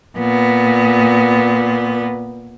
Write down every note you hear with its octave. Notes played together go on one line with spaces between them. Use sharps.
A#2 B3